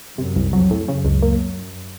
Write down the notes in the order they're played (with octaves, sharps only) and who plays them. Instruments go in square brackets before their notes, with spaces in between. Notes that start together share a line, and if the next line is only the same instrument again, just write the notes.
[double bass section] F#2 [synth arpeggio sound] C3
[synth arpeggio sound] C2
[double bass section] F2 [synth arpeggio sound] F#3
[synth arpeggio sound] A2
[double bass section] F#2 [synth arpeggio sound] C#3
[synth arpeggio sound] C#2
A#3